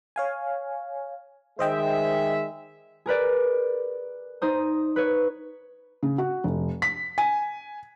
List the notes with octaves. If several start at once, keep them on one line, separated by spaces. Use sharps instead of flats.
C#5 F5 G#5
D#3 G#3 C5 D#5 E5 G5
G#4 A#4 B4 D5
D#4 C5 D#6
B4 C#5
C#3
F#4
F1
B6
G#5